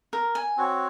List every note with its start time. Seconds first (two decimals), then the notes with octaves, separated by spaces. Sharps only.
0.13 A#4
0.35 G#5
0.57 C4 F#4 C#5